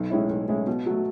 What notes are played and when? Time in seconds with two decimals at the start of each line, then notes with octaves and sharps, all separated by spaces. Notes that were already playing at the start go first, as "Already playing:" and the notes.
Already playing: B1
0.10 A2 G#3 C#4 E4
0.29 B1
0.48 A2 G#3 C#4 E4
0.67 B2
0.86 F#3 A3